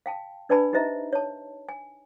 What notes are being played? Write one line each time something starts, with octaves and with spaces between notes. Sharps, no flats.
F5 G5 A5
D4 B4 D5 G#5 A5 B5
D#4 G4 C5 D#5 E5 A#5
C#5 A5
G#5